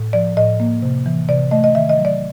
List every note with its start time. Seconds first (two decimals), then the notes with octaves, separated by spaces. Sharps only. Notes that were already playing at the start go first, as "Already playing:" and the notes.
Already playing: A2
0.13 F3 D5
0.37 A2 D#5
0.60 A#3
0.82 C3
1.06 E3
1.29 C3 D5
1.51 A3 D#5
1.64 D#5
1.75 D#3 E5
1.89 D#5
1.97 F#3
2.05 D5